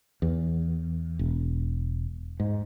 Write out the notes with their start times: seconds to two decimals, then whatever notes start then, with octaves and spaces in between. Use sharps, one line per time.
0.22 E2
1.19 E1
2.40 G#2